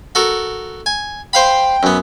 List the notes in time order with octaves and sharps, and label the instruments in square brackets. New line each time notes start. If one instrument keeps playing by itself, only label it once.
[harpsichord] F#4 A4 A#4
G#5
[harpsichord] C5 F5 B5 [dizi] G5
[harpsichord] F#2 B3